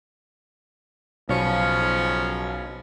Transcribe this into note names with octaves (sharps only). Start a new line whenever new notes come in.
B1 C#3 F3 C#4